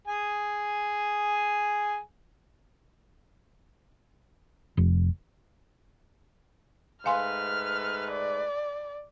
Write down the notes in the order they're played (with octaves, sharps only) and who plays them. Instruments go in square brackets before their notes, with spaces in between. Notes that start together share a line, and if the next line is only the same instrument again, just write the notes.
[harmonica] G#4 G#5
[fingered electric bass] F1
[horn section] G#2 A3 B4 [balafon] F5 G#5 C6 [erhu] F6
[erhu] D5